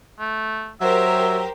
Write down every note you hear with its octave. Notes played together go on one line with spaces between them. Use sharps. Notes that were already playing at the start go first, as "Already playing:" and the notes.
A3
F#3 G4 A#4 C5 E5